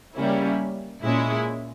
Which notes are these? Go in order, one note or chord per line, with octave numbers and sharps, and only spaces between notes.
C#3 G3 A#3 C#4 E4
A#2 G#3 C#4 E4